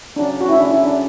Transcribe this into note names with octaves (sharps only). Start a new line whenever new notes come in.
C#3 F#3 C#4 D4
F#4
E4
D4
E4
D4